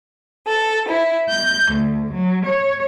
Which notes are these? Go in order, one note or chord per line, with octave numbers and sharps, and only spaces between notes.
A4
E4
G6
D2
F#3
C#5